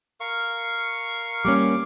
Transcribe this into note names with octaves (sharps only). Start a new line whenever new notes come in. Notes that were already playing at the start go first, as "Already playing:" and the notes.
A#4 F5 C#6
G3 A#3 C#4 D6